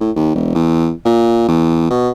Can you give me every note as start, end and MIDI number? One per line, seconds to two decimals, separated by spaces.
0.01 0.11 45
0.16 0.30 39
0.35 0.54 28
0.55 0.91 40
1.05 1.45 46
1.48 1.87 40
1.90 2.10 47